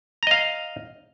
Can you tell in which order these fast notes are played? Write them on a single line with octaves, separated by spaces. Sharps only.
A#5 D#5 F5